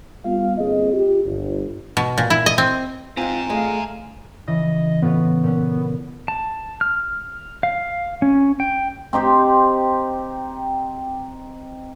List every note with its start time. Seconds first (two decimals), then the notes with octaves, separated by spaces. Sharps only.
0.25 G3 B3 F4 F5
0.57 G1 A#3 C4 G#4 D#5
0.93 F4 G4
1.25 G1
1.97 B2
2.18 A#2
2.30 E4
2.46 D#5
2.58 C4
3.17 G#2 C4 F4 G#5 A#5
3.49 G#3 A3 G#4 D5 F5
4.48 C#3 E3 D#5
5.02 A2 B3 F4 C#5
5.44 A#2 C#4 F#5
6.28 A5
6.81 F6
7.63 F5
8.22 C#4
8.60 G5
9.13 C4 D#4 G4 C5